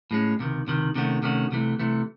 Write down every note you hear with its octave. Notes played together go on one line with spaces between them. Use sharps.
A2 G#3 C#4
C#2 C3 D#3
C#2 C3 D#3
C3 D#3 A3 C#4 F#4
C3 D#3 A3 C#4 F#4
C2 C3 E3 A3
C2 C3 E3 A3